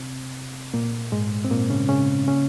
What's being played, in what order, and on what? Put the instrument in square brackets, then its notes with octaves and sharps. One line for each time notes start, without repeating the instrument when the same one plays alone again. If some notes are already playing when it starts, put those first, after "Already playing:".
Already playing: [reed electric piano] C3 C4
A#2 A#3
G#2 G#3
C4
A#2 A#3
C#3 C#4
C#3 C#4
C#3 C#4